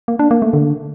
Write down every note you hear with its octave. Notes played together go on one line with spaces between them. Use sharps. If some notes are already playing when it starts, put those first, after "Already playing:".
A#3
D4
A#3
A3
D3